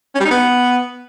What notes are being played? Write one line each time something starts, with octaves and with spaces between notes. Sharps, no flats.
C#4
G3
D#4
B3